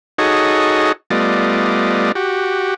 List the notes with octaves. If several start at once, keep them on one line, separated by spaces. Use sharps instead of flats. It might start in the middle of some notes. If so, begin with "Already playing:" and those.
D#4 F#4 G#4 A4 C#5 D#5
G3 A3 B3 F4 D5 D#5
F#4 G4